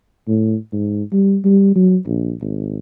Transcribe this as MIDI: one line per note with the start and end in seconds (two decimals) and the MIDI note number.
0.28 0.56 45
0.73 1.03 44
1.12 1.38 55
1.45 1.72 55
1.76 1.97 54
2.06 2.34 34
2.41 2.79 32